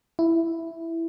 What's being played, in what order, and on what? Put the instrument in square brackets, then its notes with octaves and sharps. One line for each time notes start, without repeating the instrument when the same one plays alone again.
[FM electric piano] E4